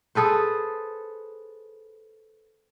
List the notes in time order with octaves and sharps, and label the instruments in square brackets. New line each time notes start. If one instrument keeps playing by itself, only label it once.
[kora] G#4 A4 B4 C5